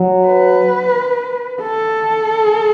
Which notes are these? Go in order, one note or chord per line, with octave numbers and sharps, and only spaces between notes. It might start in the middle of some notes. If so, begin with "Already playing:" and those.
Already playing: F#3
B4
A4